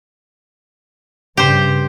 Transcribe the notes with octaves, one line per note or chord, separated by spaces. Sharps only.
G2 C#3 G4 C5